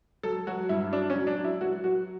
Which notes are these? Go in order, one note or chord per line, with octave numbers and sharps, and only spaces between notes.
F#3 A4
F#3 F#4
G2 E4
F#3 D4
C#4
F#3
D4
F#3
E4
F#3 F#4
F#3 F#4